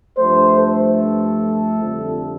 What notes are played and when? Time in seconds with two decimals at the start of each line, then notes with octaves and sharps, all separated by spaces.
0.18 G2 F3 A3 C5
0.59 A4
1.83 F2 D3 G3 C4